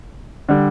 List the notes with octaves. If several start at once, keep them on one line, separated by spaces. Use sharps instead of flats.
D3 G3